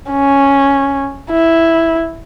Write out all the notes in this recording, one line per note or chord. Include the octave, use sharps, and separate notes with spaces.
C#4
E4